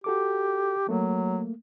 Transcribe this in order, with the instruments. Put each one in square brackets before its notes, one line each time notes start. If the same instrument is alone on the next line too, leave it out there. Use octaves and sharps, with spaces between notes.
[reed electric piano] F#4 A4 D6 [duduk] G4
[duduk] F#3 [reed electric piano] A3 A#3